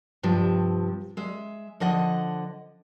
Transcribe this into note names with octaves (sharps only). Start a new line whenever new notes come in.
G2 C3 F3
G#3 E5
D3 F3 D#5 F#5